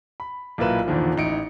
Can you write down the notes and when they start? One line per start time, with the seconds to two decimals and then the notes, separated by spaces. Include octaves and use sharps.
0.20 B5
0.58 B1 A#2 A#3 E4 B4 E7
0.87 E2 A#2 D3 D#3 F3
1.17 A1 D#4 E4 C#7 D7